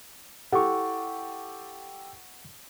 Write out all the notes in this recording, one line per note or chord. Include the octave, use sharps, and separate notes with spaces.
E4 G4 A4 F#5 C#6